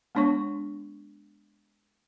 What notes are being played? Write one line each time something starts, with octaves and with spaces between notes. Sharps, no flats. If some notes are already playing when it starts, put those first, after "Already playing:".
G#3 B3 D4 C#5 C#6